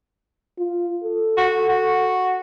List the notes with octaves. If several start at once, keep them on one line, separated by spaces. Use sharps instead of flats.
F4
A4
F#4
F#4